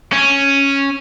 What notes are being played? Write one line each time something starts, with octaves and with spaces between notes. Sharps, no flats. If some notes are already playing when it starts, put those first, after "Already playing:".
C#4